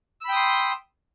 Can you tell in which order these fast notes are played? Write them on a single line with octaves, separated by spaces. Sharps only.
E6 B5 G5 D#6 C6